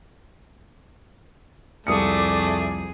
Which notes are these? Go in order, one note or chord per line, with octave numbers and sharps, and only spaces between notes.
C2 F2 A3 G#4 D5 D#6 C#7